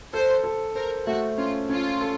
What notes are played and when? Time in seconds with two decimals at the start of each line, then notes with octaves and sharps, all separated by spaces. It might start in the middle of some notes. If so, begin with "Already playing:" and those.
0.13 A4 C5
0.44 A4
0.75 A#4 C5
1.06 A3 F#4
1.38 C#4 F4
1.69 C#4 F4
2.01 A4